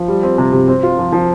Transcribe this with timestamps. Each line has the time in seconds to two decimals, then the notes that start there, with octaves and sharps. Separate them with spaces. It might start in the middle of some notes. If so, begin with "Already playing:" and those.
Already playing: F3
0.08 G3
0.23 C4
0.38 C3
0.53 C3
0.68 C4
0.83 F4
0.98 F3
1.12 F3